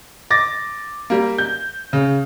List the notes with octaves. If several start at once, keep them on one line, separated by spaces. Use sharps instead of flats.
D6 A6 A#6
G3 A#3
G6
C#3